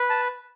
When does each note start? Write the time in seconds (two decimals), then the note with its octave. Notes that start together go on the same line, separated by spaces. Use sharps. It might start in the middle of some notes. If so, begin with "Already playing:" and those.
Already playing: B4
0.10 A5